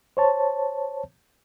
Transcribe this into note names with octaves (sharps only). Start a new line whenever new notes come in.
C5 C#5 A5